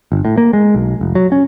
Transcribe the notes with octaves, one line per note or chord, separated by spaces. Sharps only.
G1
A2
A#3
G#3
B1
F1
F#3
C#4